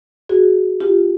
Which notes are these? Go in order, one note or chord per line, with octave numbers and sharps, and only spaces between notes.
F#4 G#4
F4 G4